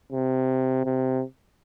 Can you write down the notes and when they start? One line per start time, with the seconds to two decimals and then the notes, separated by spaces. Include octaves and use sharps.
0.13 C3
0.85 C3